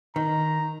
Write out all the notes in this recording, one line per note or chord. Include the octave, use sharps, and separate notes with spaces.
D#3 A#5